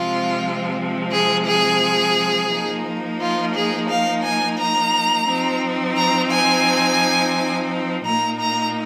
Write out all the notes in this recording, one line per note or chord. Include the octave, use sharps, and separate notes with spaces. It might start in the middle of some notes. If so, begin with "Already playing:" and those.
Already playing: C3 F3 G#3 C4 F4
G#4
G#4
F3 A#3 D#4
F4
G#4
F5
G#5
A#5
F3 C4 D#4
A#5
G#5
A#2 A#3 D#4 A#5
A#5